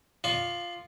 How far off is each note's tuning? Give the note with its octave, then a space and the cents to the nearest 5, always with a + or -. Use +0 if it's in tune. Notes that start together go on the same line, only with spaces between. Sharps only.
F4 +0 D5 +45 C#6 +20